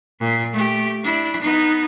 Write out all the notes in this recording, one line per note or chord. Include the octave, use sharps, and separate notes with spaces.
A#2
A3 G4
D4 E4
B3 D#4